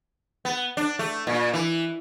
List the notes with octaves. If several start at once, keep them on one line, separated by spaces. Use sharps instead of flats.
B3
D4
A3
A#2
E3